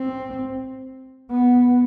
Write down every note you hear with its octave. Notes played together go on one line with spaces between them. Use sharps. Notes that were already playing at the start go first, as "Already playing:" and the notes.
Already playing: C4
B3